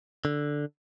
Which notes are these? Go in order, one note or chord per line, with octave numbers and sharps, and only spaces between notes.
D3